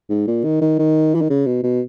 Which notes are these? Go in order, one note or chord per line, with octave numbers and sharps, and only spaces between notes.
G#2
A#2
D#3
D#3
D#3
E3
D#3
C#3
B2
B2